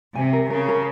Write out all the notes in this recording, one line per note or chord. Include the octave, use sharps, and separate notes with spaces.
C3 G#5
A#4
C#3 A#4
A#4